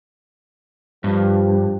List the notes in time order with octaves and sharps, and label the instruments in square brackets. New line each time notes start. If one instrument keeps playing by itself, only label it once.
[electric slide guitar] G2 [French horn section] F3 G4